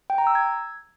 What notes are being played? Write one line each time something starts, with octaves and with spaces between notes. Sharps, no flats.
G5
A#5
E6
G#6